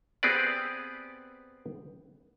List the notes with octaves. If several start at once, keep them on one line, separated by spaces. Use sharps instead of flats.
B3 C4 G4 G#4 B4 D5